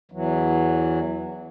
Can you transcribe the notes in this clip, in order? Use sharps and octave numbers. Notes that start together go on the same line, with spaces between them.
E2 E3 F#3